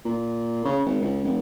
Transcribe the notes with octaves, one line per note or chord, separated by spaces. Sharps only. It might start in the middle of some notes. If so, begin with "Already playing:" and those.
A#2
C#3
G#1
C#2
F1